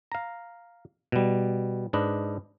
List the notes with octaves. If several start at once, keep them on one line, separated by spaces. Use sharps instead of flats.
F5 A#5
B2 G3
G#2 D4 B4 D#5